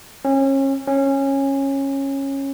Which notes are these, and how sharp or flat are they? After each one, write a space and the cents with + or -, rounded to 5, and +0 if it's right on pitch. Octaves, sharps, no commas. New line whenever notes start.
C#4 -30
C#4 -15